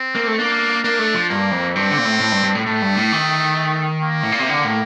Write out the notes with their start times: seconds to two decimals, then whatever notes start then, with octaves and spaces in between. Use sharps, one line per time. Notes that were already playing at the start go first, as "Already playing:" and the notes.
Already playing: C4
0.15 A#3
0.27 A3
0.38 A#3 D4
0.84 A#3 D4
0.99 A3
1.14 F3
1.29 G2 A#3
1.52 F2
1.75 G2 C4
1.91 D3
1.98 A#2
2.05 A2
2.20 A2
2.32 G2
2.44 G2
2.55 A2
2.66 A2 A3
2.82 G2
2.97 A2
3.12 D#3
4.03 A#3
4.23 A2
4.32 A#2
4.39 C3
4.49 D3
4.64 A2